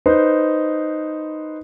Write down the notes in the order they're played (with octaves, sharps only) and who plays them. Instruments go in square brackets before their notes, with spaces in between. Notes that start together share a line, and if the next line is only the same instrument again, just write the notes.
[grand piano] D#4 B4 C5